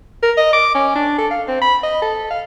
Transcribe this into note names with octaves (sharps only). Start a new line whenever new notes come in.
A#4
D#5
D6
C#4
D4
A4
F5
C4
B5
D#5
A4
F5